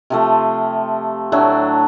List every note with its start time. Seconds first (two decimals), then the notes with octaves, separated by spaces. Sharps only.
0.10 C3 F3 A3
1.32 A2 F#3 A3 D4